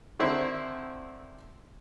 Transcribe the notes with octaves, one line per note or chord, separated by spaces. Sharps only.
D3 D#3 C4 E4